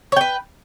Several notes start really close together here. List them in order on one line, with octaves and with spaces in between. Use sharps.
C#5 G5 B4